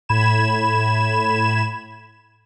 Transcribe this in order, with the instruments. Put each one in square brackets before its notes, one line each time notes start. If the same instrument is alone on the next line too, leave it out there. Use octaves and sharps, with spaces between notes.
[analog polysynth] A2 B5 G#6 E7